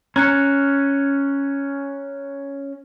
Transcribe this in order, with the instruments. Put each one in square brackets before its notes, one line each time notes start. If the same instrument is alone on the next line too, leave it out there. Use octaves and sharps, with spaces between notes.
[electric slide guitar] C#4 [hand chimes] A#5 F#6 C#7